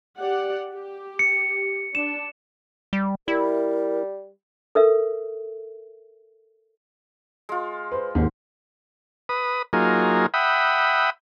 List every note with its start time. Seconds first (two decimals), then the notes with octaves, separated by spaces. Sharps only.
0.19 G4 D5 F#5
0.72 G4
1.19 C#7
1.95 D4 E7
2.93 G3
3.28 G3 E4 A#4
4.75 A4 A#4 E5
7.49 G#3 F4
7.91 B4 C5
8.15 D#2 G#2
9.29 B4 D#6
9.73 F#3 A#3 D#4 F4 G#4
10.34 E5 F#5 G5 B5 D#6